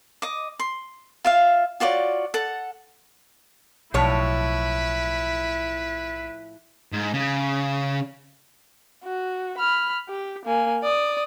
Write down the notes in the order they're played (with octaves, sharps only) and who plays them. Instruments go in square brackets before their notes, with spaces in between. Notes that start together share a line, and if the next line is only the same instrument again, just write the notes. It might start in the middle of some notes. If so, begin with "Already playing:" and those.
[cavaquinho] D#5 D6
C6
F4 E5 F5
F4 F#4 C#5 D5
A4 F#5
[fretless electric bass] B1 [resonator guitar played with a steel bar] A2 F3 C#5 [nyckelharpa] E4 [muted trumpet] B4
[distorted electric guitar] G#2
C#3
[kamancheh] F#4
B5 F6
G4
A#3 G#5
D5 D#6